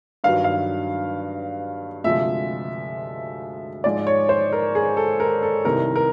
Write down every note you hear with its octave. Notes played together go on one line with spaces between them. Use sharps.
G2 D#3 F#3 F5
F5
D2 C3 F3 G#3 E5
G#2 F3 G#3 D5
C#5
C5
A#4
G#4
A4
A#4
A4
C2 C3 D#3 A#4
A#4